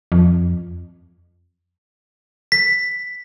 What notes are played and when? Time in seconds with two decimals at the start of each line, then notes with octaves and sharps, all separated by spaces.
0.12 F2
2.52 B6